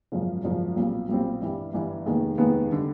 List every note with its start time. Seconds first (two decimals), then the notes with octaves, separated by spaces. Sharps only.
0.12 G#1 F#2 C#3 F3
0.44 G#1 F#2 C#3 F3
0.76 B1 A#2 G3 C4
1.09 B1 A#2 G3 C4
1.41 G1 G2 E3 G3
1.73 G1 G2 E3 G3
2.06 F1 D#2 D#3 G#3 B3
2.38 F1 D#2 D#3 G#3 B3
2.72 D3 G3